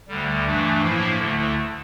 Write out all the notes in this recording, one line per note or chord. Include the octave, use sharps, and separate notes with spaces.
D2 D3 G3
G2 E3 A3 D4
A2 F3 A#3 E4
D2 D3 A3